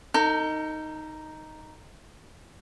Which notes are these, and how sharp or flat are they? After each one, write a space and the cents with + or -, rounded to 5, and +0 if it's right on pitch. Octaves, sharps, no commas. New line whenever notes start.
D#4 +0 A4 +45